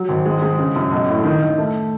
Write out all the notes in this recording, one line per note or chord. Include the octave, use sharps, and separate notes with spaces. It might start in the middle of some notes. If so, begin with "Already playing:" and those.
Already playing: F#3
G#1
G#3
G#3
C#3
F#2
B1
A2
D#3
D#3
A3